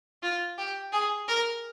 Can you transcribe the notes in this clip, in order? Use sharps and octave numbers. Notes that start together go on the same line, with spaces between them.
F4
G4
G#4
A#4